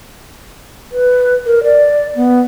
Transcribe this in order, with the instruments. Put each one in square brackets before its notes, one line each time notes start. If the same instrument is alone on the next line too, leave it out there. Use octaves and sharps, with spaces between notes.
[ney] B4
A#4
D5
B3